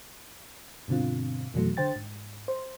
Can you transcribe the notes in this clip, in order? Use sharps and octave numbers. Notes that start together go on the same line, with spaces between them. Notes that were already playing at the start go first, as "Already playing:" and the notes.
G2 B2 D3 C4 F4
F2 B2 E3 F#3 A3
D3 C5 G5 A6
G#2
C5